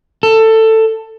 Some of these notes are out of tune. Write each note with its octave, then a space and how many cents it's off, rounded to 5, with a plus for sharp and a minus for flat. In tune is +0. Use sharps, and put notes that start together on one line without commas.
A4 +15